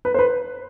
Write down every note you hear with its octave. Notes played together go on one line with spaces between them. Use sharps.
B4
C5
B4